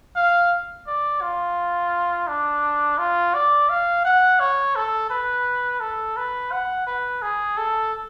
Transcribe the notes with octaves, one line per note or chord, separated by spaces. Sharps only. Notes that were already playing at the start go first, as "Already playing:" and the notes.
F5
D5
F4
D4
F4
D5
F5
F#5
C#5
A4
B4
A4
B4
F#5
B4
G#4
A4